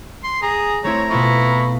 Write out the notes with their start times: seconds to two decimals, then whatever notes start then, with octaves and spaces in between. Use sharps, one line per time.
0.24 C6
0.42 G#4 A#5
0.84 A3 C4 E4 C#5 A#5
1.11 B2 B3 E4 F4 B5 C#6